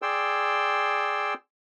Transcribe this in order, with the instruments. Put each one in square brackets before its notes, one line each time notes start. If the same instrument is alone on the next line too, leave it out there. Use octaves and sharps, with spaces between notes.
[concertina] G#4 D5 G5 C6 E6